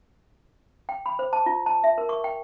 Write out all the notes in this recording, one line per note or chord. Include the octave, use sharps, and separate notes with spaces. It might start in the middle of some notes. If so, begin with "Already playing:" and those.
G5
B5
C5
A5
F4
A5
E5
A#4
C#6
G5